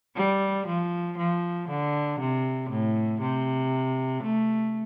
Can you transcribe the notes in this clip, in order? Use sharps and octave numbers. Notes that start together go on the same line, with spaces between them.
G3
F3
F3
D3
C3
A2
C3
A3